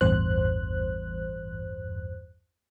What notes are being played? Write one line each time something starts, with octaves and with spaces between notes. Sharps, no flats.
A1 E2 G2 C5 F#6